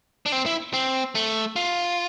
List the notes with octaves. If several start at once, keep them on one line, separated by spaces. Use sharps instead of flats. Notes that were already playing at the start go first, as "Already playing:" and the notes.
D4
C4
E4
C4
A3
F4